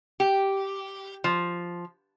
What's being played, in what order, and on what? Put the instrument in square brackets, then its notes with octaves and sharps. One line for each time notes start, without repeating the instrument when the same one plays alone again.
[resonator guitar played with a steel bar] G4
F3